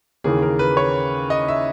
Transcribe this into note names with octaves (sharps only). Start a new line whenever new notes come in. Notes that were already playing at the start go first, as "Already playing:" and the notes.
D#2 C#3 E3 A#3 C#4 G#4
A#4
B4
C#5
D#5
E5